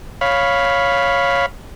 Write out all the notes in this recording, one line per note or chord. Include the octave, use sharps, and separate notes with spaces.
C#5 F5 B5